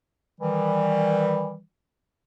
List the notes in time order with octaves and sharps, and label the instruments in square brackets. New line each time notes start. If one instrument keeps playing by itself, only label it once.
[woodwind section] D#3 E3 G3